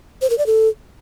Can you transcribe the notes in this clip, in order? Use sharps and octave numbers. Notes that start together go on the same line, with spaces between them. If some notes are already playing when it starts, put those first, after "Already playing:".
C5
A#4
D5
A4